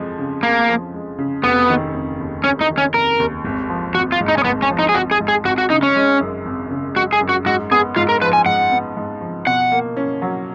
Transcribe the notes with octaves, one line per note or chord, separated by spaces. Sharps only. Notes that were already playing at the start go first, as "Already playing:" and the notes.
Already playing: F2 F3 G#3
C#3
F2 A#3
F3
G#3
C#3
F1 B3
D#3
F1
D#2
F1 C#4
D#4
D#3
C#4
F1 A#4
D#2
G#1
F3
G#1 F#4
F4
G#2
D#4
C#4
G#1 B3
C#4
F3
D#4
G#4
G#1 F#4
G#4
G#2
G#4
G#1 F#4
F#4
C#3 D#4
C#4
G#3
F#2
G#1
C#3
G#3 F#4
G#4
F#2
F#4
G#2 F#4
B3 G#4
G#2 F4
A#4
F3 B4
G#5
G#2 F#5
B3
G#2
F3
B2 F#5
A#3
C#4
F#3